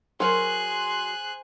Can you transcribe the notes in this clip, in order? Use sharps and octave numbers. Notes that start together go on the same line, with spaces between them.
F#3 G#4 A#4 C5 F#6